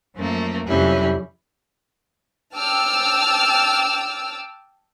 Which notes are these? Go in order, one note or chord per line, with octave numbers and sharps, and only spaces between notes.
F#2 F3 A3 A#3
F2 C3 F#3 G3 C#4 E4
G5 A5 D6 E6 F6